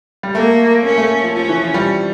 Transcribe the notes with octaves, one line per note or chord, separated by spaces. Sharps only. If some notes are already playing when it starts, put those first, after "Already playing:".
G3
A3 A#3
A#3 C#4
A3
F3
F3 C#4
E3
F3
G3